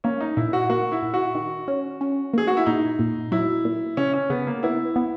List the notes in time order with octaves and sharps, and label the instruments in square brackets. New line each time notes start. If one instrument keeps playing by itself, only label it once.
[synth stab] A#3 [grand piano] C#4
[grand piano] D#4
[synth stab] A#2 [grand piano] E4
[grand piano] F#4
[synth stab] A#3 [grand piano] F#4
[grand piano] E4
[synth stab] A#2
[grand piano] F#4
[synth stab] D#3
C#4
C#4
[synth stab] A#3 [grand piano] G#4
[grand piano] F#4
E4
[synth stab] A#2 [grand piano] D#4
[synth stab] A#2
[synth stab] F#3 [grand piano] E4
[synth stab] A#2
[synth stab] C#3 [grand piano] C#4
[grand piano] C#4
[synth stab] C#3 [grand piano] B3
[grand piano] A#3
[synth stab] B3 [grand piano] E4
[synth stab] B3